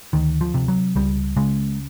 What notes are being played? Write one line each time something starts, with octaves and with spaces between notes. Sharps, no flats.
D2 D#3
F3
C3
F#3
C#2 G3
C#3 G#3